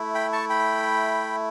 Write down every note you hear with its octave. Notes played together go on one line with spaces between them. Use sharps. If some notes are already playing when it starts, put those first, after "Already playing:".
Already playing: A3 E4
G5 B5
A5 C#6
G5 B5